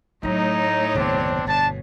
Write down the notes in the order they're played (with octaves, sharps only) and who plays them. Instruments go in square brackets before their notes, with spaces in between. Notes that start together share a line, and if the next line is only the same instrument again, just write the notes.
[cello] A2 C#5 [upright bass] F#3 A3 [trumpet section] D#4
[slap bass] F#1 D#2 C3 [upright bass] B3 [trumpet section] C4 D4
[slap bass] G1 B2 [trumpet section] D4 A5